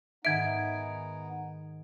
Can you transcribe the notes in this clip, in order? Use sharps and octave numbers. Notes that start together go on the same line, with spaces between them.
G#2 D#3 B3 D#4 E5 G#5 G#6 D7